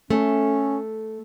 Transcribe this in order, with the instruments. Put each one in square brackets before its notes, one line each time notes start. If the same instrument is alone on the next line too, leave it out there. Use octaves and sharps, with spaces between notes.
[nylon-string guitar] A3 [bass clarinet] C#4